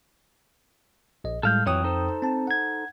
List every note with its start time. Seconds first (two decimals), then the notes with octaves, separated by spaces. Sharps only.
1.24 A#1 D#5
1.43 A2 G3 G#3 A4 F5 G6
1.66 F2 E3 F#3 C#5 G5 D#6
1.84 D#4 A4 C5
2.22 C4 A5
2.47 F#5 G#6